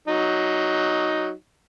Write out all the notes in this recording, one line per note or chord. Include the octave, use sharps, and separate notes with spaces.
F#3 D#4